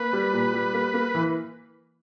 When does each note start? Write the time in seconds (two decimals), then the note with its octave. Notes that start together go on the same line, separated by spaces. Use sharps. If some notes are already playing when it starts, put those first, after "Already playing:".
Already playing: A#3 B4
0.13 G3
0.33 A#2
0.54 G3
0.74 A#3
0.94 A#3
1.15 E3